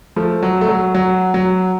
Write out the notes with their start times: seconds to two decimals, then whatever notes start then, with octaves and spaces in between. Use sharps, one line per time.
0.16 F3 A3
0.43 F#3
0.61 A3
0.69 F#3
0.95 F#3
1.34 F#3